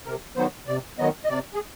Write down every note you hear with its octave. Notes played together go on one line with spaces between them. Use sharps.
C3 A#4
D#3 F#3 B3 C5
C3 D5
D#3 F#3 B3 D#5
D#5
C3 D5
G#4